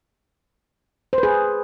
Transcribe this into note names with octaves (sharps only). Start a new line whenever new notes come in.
C5
B4
G#4